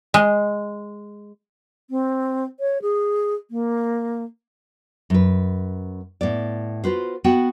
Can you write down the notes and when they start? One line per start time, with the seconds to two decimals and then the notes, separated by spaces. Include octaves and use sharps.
0.14 G#3
1.90 C4
2.60 C#5
2.82 G#4
3.51 A#3
5.10 F#2 B4
6.21 A2 B3 D5
6.84 F4 F#4 B4 C5
7.24 B3 F#4 F#5 G5